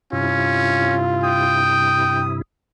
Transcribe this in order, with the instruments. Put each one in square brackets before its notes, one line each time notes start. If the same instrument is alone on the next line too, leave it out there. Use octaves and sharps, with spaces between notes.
[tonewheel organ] G2 C3 E4 [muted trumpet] C#4 [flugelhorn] F4
[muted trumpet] G5 [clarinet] D#6